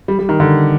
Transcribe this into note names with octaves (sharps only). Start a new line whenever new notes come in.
G3
G3
D#3
D3